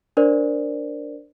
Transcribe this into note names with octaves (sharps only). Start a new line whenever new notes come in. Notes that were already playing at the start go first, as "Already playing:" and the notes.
D4 A#4 C5 D5